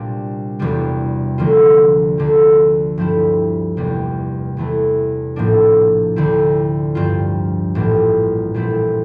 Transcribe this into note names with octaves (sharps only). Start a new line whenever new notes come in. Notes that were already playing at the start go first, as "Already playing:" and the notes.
Already playing: C2 A#2 G3 D4
E1 E2 C3 G3
D2 D3 F3 A#3 F4
D2 D3 F3
G2 F3 A3 C4 E4
F1 E2 C3 G3 A#3
E1 E2 E3 A3
A#1 A2 F3 A#3 D4
D2 D3 A3 C4 E4
G2 F3 C4 F4
A#1 A2 E3 G3
A#1 A#2 A3 C4 E4